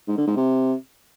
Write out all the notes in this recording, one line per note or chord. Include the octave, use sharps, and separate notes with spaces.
G#2
D3
G#2
C3